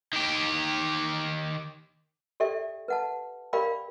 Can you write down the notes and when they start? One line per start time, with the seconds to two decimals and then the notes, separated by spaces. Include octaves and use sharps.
0.13 D#3 G4
2.40 G4 A4 D5 E5 G5
2.88 B4 F#5 A5
3.53 G4 A#4 D5 F5 G5 B5